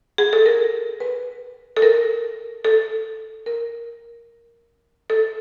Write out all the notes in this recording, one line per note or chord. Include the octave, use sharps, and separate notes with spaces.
G#4
A4
A#4
B4
A4
A#4
A4
A#4
A4